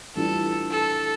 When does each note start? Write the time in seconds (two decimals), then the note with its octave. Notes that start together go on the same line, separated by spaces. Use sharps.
0.15 A2 E3 G3 D4 F4 A4
0.71 A4